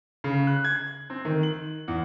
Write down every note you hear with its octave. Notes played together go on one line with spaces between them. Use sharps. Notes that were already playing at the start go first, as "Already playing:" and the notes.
C#3
F#6
G#6
C4
D#3
F#7
E2